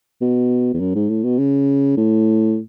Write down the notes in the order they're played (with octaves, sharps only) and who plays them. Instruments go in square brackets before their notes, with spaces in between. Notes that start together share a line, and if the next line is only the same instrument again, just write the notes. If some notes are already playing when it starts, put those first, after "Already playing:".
[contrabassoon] B2
E2
F#2
G#2
A2
B2
C#3
A2